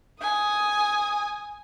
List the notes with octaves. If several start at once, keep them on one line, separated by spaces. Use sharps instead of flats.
G#5 D#6